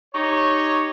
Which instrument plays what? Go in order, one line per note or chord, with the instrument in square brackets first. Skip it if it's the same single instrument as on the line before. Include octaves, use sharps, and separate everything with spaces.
[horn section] D#4 G4 C#5